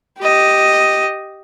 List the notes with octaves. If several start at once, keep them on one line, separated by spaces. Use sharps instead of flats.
G4 D#5